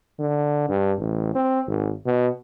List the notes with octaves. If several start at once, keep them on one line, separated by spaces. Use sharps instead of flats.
D3
G2
A1
C4
G#1
B2